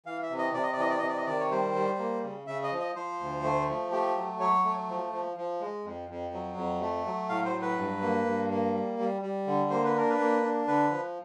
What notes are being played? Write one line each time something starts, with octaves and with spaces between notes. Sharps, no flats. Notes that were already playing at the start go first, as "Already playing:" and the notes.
E3 F5
E5
C3
D#5
C3 D5
D#5
D5
E3 D#5
D5
C3 D#5
D5
D#5
D#3 D5
C#5
G3 C5
G3
A#3
C#3
C#3 E5
D#5
F3
D#5
F3 C5
D2
A3
F3
A3 G4
F#3
F#3 C#5
A3
F3
F3
F3
G#3
F2
F2
F#3
F2
A3
F#3
A2 F5
C5
F#3
B4
G2
A#3
G2
A#3
G3
G3
G3
D3
A#3 C5
B4
D4 A#4
B4
A#3
D4
D3 B4
F3